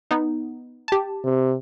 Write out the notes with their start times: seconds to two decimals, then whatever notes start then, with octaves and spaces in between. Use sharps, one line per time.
0.11 B3 D#4
0.88 G4 A5
1.24 C3